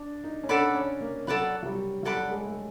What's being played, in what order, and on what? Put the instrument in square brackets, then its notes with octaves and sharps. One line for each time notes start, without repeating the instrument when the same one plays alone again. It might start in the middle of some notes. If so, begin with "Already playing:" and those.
Already playing: [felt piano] D4
D#4
C#4
[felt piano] D4 [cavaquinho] A4 D5 F#5 B5
[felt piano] C#4
A#3
[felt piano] F#3 [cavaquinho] A4 D5 F#5 B5
[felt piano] F#3
G3
[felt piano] F#3 [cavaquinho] A4 D5 F#5 B5
[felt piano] G3
G#3
A3